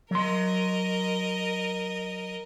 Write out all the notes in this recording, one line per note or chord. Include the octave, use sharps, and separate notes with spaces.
F#3 A#4 D#5 C6